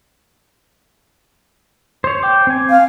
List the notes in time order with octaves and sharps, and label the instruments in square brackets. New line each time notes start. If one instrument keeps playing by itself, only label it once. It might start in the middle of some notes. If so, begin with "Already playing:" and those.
[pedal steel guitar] C5 C#5
G5 D6
C4 G#5
[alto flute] F5